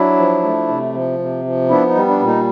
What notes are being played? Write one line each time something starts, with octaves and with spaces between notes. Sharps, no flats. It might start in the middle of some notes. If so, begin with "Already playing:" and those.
Already playing: F#3 D4 E4
F3
A3
C3
F3
C3
F3
B3 D4 E4
D#4
G3
D4
A#2
D#4